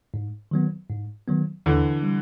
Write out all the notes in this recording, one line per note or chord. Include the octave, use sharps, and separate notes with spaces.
G#2
D#3 F#3 B3
G#2
D#3 F#3 B3
D#2 D3 E3
G3